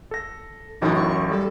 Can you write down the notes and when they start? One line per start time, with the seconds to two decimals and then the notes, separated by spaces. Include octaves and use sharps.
0.11 A4 A#6
0.82 A1 F#2 A2 D#4
0.96 C#6
1.31 G3 A4